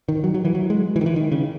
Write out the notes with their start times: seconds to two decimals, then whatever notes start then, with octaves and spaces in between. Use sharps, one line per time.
0.09 D#3
0.24 F#3
0.34 F#3
0.45 E3
0.55 F#3
0.70 G#3
0.96 E3
1.01 D#3
1.06 E3
1.16 D#3
1.32 C#3